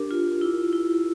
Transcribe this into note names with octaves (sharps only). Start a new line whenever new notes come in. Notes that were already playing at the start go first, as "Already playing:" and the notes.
Already playing: D4 G4 A#4
F4
E4
E4